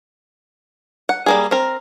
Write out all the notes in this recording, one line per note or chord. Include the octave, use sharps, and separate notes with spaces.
F#5
G3 A#3 G#4
C4 A#4